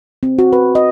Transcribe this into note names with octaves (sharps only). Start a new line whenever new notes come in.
C4
F#4
B4
D#5